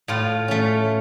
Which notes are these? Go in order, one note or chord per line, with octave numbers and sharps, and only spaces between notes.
A2 F4
A3 C#4